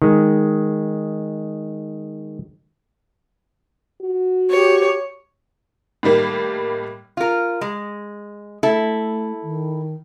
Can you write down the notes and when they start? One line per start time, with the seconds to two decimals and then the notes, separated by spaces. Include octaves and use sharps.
0.02 D#3 G#3
4.01 F#4
4.51 G4 C#5
6.03 A2 D#3 G3 A#3
7.17 F4 A#4
7.61 G#3
8.63 A3 E4 A4
9.42 D#3